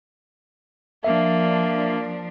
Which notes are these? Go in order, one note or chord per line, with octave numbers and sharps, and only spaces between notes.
F3 A#3 D4 E5